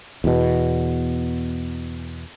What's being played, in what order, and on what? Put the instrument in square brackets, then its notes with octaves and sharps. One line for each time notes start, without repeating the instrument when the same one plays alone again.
[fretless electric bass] E2 B2